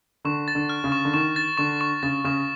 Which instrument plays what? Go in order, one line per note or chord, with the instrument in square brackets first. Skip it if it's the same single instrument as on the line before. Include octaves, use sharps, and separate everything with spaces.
[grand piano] D3 [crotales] C#6
[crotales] A6
[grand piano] D3
[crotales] F6
[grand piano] C#3
[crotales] C#6
[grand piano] D3
[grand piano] D#3 [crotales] C#6
[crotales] A6
[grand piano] D3 [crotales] C#6
[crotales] C#6
[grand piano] C#3 [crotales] A6
[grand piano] C#3 [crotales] C#6